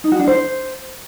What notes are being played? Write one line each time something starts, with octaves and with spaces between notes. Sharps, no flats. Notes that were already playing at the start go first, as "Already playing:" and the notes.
D#4
F#4
D4
C5